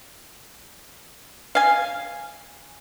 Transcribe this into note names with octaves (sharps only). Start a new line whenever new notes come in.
F5 G#5